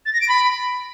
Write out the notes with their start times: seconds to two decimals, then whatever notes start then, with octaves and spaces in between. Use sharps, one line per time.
0.05 A6
0.13 A#6
0.21 D7
0.28 B5